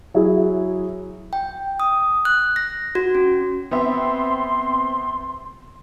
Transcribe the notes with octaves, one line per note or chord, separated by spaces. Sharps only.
F#3 E4 G#4
G5
D#6
F#6
A#6
F#4
C#4
B3 C4 E5 C6